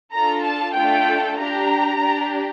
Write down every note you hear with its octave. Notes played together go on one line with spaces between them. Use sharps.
D4 F4 A4 A#5
A5
A3 D4 F4 A4 G5
D4 G4 A#5
D4 G4